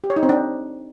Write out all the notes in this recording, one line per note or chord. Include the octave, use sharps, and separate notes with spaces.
G4
C#5
D#4
C4
D4